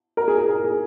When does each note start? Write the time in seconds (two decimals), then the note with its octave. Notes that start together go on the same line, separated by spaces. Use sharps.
0.17 A#4
0.28 G#4
0.38 G#4
0.48 A#4
0.64 G#4